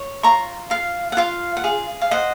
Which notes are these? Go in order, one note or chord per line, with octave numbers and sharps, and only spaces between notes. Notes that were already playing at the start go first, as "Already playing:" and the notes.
Already playing: C#5
F4 A#5 C#6
F4 F5
F#5
F4 F5
F#5
G#4 F5
F5
C5 D#5 F#5